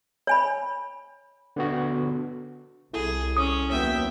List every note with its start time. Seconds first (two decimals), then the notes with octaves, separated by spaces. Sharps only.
0.27 C#5 G#5 B5
1.56 D3 B3 F#4
2.94 C2 E4 G#4 A4
3.37 C#4 D#6
3.71 D#2 F#3 B3 E5 G5